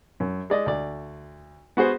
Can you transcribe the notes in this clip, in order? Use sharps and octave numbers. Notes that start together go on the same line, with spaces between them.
F#2
G#3 D5 D#5
D2 D5
B3 F#4 G#4 C5